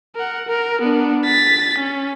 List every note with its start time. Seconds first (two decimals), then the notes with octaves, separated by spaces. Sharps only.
0.15 A#4 F#5
0.48 A#4
0.81 B3 D4
1.25 A6 B6
1.78 C#4